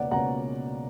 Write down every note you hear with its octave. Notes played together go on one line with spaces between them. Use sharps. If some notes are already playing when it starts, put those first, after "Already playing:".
Already playing: C#2 B2 A#3 C#4 D5 F#5
C#2 B2 A#3 C#4 F#5 A#5